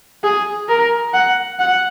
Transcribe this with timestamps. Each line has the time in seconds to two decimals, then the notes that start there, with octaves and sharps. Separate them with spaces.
0.24 G#4
0.69 A#4
1.14 F#5
1.59 F#5